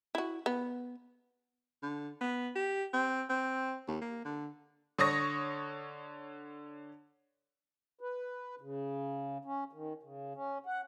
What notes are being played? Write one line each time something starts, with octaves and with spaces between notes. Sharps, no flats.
E4 F#4
B3
D3
B3
G4
C4
C4
D#2
A#3
D3
D3 C#5 C#6 D#6 A#6
B4
C#3
C#4
D#3
C#3
C#4
F#5